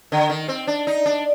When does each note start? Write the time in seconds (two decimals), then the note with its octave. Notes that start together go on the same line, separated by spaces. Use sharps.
0.12 D3
0.30 D#3
0.48 C4
0.67 D4
0.87 D#4
1.06 D4